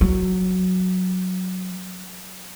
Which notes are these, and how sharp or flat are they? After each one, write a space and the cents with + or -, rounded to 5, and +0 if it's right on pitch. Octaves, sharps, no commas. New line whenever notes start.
F#3 -5